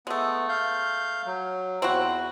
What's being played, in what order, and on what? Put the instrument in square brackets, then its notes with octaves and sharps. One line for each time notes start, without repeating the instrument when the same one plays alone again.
[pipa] G#3 A3 [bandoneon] B3
[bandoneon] F5 G6
F#3
[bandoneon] E2 [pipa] C4 E4 F#4